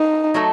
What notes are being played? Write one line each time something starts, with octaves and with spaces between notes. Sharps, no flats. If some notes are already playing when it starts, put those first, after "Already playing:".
Already playing: D#4
F#3 A3 D#4 A4